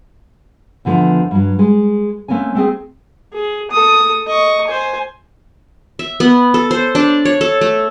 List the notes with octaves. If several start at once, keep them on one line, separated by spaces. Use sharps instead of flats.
E2 D3 F3 A3
G2 F#3
G#3
A3 A#3 C4 C#4 G#5
A3 C4 G#4
G#4
A4 D#6
D#5 C#6
C5 G#5
E5
B3
A4
C5
D4
C#5
A4
A3